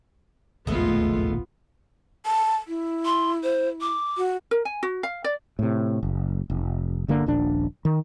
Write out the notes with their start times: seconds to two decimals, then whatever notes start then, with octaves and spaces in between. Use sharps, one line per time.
0.67 E1 A#1 D#2 G#3 A3 B3 F4
2.26 A5
2.68 E4
3.05 C6
3.43 C5
3.81 D6
4.17 F#4
4.51 A#4
4.65 G#5
4.83 F#4
5.03 F5
5.24 D5
5.59 A2 C3
6.03 F#1
6.50 F1
7.08 G1 D3 A#3
7.26 D#1 A#1 D4
7.85 D#3